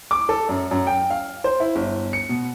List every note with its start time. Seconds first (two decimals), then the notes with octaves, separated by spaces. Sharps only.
0.11 D6
0.29 A4
0.49 F#2
0.71 F#2
0.87 G5
1.11 F5
1.44 C5
1.60 E4
1.76 G1
2.13 C#7
2.29 B2